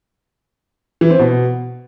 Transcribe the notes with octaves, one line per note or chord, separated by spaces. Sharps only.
E3
C4
B2